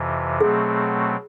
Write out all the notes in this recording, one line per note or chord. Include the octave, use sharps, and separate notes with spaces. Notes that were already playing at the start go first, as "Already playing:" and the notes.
Already playing: F2 C3 E3
B2 F#3 A3 C4 G#4